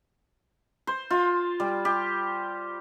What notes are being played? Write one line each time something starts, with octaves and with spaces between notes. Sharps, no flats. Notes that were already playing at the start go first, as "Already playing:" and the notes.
C5
F4
G3
G4